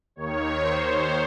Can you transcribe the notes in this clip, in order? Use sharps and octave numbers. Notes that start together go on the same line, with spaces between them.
D#2 D#3 C#5
C5